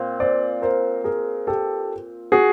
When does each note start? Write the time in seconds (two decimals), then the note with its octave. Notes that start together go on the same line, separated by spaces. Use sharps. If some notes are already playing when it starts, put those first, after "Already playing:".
Already playing: A#2 C4 F4
0.20 C5 D5
0.62 A#4 C5
1.04 G#4 A#4
1.47 G4 A4
2.32 F#4 G#4